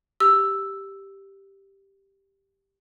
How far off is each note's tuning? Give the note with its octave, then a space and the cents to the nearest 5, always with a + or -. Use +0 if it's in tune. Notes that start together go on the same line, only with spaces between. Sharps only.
G4 +0 E6 +0